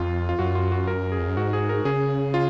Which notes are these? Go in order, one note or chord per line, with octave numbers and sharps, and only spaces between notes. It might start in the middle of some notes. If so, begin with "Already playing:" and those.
Already playing: F2 F4
F4
F#2 F#4
F4
F#4
A#4
G#4
F2
F#2
G#2 F#4
G#4
A#4
C#3 G#4
F4